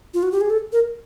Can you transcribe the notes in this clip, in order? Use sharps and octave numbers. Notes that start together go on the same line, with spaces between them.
F4
F#4
G4
G#4
A4
A#4